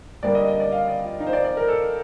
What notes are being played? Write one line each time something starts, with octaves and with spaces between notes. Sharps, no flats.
D3 G3 A#3 D4 D5
D#5
D#5
D5
F5
D5
F4
D#4
C5
D5
D5
A#4
A4